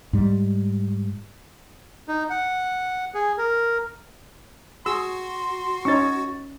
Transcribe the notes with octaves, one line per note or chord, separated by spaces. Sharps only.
G#2 G3
D#4
F#5
G#4
A#4
F#4 G#4 C6 E6
C#4 D#4 C#5 C#6 A6